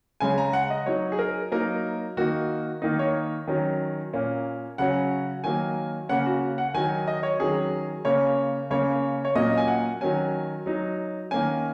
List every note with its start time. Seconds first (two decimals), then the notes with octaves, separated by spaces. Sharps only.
0.20 C#3 G#3 C#4 G#5
0.38 A#5
0.53 F#5
0.70 D#5
0.86 F#3 D#4 C#5
1.12 G#4
1.19 A#4
1.52 F#3 A#3 D#4 A#4
2.17 D#3 A#3 D#4 F#4
2.82 D#3 A#3 D#4
2.99 C#5
3.47 D#3 F#3 C#4
4.13 A#2 A#3 C#4
4.78 C#3 F#3 C#4 F#5
5.44 D#3 F#3 A#3 G#5
6.09 C#3 A#3 C#4 F#5
6.26 F#4
6.58 F#5
6.74 D#3 F#3 D#4 G#5
7.07 D#5
7.23 C#5
7.39 D#3 F#3 C#4 G#4
8.05 C#3 A#3 C#4 C#5
8.70 C#3 A#3 C#4 C#5
9.25 C#5
9.35 A#2 F#3 A#3 C#4 D#5
9.58 G#5
9.68 F#5
10.01 D#3 F#3 C#4 G#5
10.66 F#3 D#4
11.31 D#3 A#3 C#4 G#5